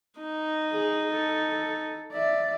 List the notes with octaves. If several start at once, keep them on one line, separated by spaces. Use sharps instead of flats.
D#4
G#4
A4
D5 E5